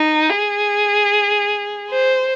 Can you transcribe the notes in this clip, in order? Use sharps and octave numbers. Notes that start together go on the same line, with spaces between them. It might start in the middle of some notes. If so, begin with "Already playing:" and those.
Already playing: D#4
G#4
C5